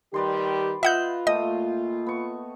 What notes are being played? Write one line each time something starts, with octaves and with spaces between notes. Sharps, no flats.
D#3 G3 G4 B4 D5 C6
F4 B4 D#5 E5 F#5 G6
A#2 A3 D#5 G5
B3 C#6